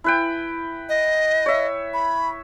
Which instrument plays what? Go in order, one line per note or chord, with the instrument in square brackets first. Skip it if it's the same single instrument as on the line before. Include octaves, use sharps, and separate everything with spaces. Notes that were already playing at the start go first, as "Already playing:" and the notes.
[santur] E4 B4 G5
[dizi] D#5
[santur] C#5 E5
[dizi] B5